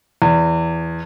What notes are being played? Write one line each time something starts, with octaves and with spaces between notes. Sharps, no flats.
E2